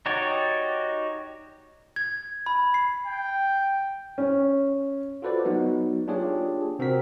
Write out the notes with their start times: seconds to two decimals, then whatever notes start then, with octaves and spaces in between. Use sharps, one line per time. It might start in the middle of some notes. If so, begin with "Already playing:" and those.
0.06 D#4 F#4 G4 C#5 D5
1.96 G#6
2.46 B5
2.74 C7
3.06 G5
4.18 C#4
5.22 F4 F#4 A4 B4 C5 D5
5.45 F#3 B3 D#4 F#4
6.07 A#3 D4 F4 G4 G#4 C#5
6.79 C3 C4 F#4 A#4 B6